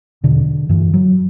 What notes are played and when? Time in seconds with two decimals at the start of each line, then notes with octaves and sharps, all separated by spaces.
0.24 E2 B2 D3
0.69 G2 D3 E3
0.94 F#3